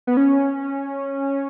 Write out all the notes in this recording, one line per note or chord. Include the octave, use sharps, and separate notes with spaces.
B3
C#4